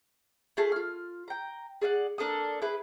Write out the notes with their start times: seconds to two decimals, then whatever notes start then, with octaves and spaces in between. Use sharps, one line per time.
0.57 A3 F4 G#4 A5
0.72 F4 F6
1.28 G5 A#5
1.81 G#4 D5 F5 F#5
2.18 A#3 D4 A4 D#6
2.62 E4 G#4 B4